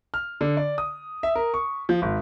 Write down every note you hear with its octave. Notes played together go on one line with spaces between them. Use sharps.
F6
D3
D5
D#6
E5
A#4
C#6
F3
G#1